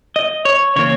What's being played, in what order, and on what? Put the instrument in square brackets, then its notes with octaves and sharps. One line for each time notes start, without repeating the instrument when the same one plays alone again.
[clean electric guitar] D#5
C#5
C#3 E3 A#3 C#5